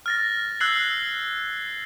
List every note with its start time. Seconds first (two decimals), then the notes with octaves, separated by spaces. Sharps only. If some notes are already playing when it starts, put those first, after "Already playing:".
0.06 F6 A6 A#6
0.60 E6 F#6 G#6 C7 F#7